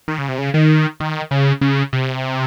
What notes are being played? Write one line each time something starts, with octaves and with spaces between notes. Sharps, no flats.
D#3
C#3
C3
C#3
D#3
D#3
C#3
C#3
C3